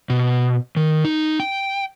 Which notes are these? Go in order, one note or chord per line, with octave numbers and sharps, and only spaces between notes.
B2
D#3
D#4
G5